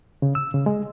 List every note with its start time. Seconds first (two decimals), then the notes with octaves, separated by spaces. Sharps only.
0.22 C#3
0.35 E6
0.54 C#3
0.66 G#3